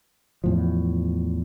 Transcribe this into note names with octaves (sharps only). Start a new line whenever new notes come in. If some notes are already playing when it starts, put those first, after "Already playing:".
E2 A2 F3